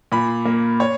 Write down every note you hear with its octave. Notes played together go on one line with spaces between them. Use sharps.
A#2 B5
A#3
C#5